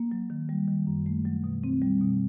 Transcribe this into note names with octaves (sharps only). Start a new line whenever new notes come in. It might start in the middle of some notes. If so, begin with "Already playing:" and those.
Already playing: A#3
F#3
D#3
G3
D#3
F#2
A3
F#3
B2
C4
G3
B2